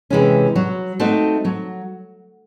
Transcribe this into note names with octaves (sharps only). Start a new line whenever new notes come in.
C3 E3 G#3 C#4
F#3
A3 C4 D#4 F#4
F#3